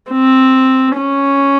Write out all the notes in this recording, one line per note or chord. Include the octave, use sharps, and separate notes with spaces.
C4
C#4